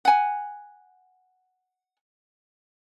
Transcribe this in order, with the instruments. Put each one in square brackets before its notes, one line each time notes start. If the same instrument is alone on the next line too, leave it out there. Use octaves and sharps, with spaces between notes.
[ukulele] F#5 G#5